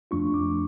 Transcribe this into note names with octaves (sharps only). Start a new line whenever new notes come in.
F2 F3 A3 D4 F4 C#6
D6